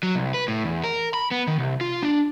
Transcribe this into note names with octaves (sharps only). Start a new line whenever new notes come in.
F#3
C2
B4
A2
E2
A#4
B5
B3
D#3
C2
F4
D4